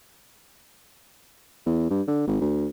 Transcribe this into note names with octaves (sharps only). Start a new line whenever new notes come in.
E2
G2
D3
G#1
D2